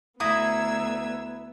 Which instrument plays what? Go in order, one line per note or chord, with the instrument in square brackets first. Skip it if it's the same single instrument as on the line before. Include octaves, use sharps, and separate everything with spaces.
[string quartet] D2 E6 G#6 [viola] B3 [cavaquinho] E4 A#5 D#6